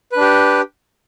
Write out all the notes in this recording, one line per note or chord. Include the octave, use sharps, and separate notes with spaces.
D4 G4 B4